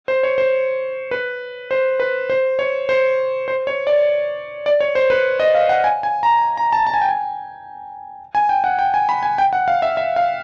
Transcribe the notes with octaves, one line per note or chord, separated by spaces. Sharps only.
C5
C#5
C5
B4
C5
B4
C5
C#5
C5
C5
C#5
D5
D5
C#5
C5
B4
D#5
F5
F#5
G#5
G#5
A#5
A#5
A5
A5
G#5
G5
G#5
G#5
G5
F#5
G5
G#5
B5
G#5
G5
F#5
F5
E5
E5
F5